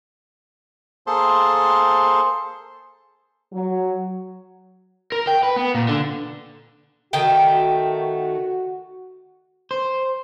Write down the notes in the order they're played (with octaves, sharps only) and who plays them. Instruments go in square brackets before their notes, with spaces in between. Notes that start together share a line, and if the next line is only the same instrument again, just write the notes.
[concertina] A#3 G#4 A4 C5 A5 C6
[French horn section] F#3
[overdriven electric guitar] A#4
G5
B4
B3
A#2
D3
[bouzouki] D#3 A3 G5 [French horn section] F#4
[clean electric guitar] C5